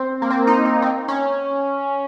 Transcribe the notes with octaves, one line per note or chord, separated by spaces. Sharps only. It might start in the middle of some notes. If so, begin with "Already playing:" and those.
Already playing: C4
A#3
C4
D#4
D#4
C4
C#4